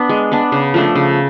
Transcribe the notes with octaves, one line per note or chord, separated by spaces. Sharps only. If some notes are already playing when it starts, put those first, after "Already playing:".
Already playing: B3 D4
G#3
B3 D4
C#3
F3 A3 D4
C#3